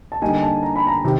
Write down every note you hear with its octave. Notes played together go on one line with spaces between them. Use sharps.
A5
D3 G3 A#3 D#4 G#5
G#5
A5
A#5
B5
A#5
C3 D#3